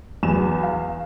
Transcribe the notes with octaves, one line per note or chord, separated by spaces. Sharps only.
E2 F#3 E7
F5